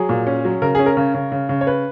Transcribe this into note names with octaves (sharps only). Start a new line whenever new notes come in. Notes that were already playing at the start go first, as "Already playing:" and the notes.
Already playing: F#3 G#4
A#2
C#4
F#3
C#3 A#4
C#4 G#4
A#4
C#3
C#3
C#3
C#3
C#5
B4